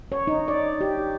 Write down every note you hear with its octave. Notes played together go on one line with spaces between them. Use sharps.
C#5
D#4
D5
G4